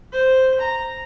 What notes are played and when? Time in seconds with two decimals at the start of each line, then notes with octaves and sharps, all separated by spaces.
0.13 C5
0.60 A#5